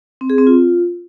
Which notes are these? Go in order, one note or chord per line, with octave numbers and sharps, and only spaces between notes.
C4
G#4
C4
F4